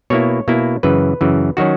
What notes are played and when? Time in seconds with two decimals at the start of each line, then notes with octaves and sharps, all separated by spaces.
0.10 B2 A#3 E4 C#5
0.48 B2 A#3 E4
0.83 F#2 C#3 E3 B4
1.21 F#2 C#3 E3
1.57 D#3 F#3 C#4 F#4